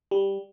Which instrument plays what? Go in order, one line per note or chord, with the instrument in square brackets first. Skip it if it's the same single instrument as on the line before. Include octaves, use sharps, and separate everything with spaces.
[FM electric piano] G3